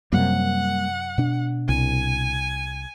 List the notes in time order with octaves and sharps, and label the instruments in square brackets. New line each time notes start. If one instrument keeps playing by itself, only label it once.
[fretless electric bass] F#2 C3 [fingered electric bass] G3 A#3 [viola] F#5
[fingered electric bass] B2 D4
[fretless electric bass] C2 [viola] G#5